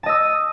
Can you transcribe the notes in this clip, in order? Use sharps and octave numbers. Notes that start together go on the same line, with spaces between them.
D#5 A5 D#6 E6